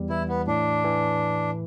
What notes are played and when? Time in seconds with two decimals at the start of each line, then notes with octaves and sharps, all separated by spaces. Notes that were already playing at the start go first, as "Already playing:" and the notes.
Already playing: E2 G3
0.10 E3 E4
0.29 B3
0.47 A2 D4
0.84 E3